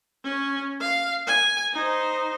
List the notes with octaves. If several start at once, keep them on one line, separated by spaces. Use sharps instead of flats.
C#4
F5
G#5
D#4 C5